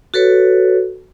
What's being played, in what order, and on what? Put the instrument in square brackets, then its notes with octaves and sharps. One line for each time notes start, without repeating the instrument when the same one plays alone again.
[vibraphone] F#4 A4 B4 C#5